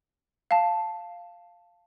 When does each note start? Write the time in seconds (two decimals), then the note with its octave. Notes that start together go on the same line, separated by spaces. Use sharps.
0.51 F5 A5